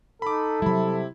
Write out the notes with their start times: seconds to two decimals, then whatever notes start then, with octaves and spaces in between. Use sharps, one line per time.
0.22 D#4 A4 B5 D6
0.62 C3 F#3 G3 E4 B5